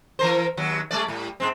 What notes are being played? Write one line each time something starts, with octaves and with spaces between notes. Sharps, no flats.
E3 A#4 C5
D#2 F#3
G3 A3 D5
A2 G3
G#2 G#3 C4